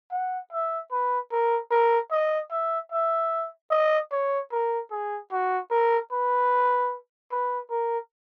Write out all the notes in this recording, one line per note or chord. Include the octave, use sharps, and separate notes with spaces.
F#5
E5
B4
A#4
A#4
D#5
E5
E5
D#5
C#5
A#4
G#4
F#4
A#4
B4
B4
A#4